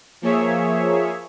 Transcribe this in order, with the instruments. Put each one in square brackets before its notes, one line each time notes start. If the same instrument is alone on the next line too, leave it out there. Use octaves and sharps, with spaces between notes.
[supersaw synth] F3 A#3 G#4 C#5 E5